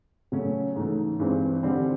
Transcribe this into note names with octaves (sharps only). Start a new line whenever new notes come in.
C#3 F#3 A3 C#4
G#2 E3 A3
G2 E3 G#3 C4
D3 G3 C4